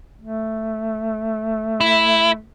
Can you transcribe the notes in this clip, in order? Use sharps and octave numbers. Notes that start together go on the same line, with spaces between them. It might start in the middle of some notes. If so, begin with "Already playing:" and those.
A3
E4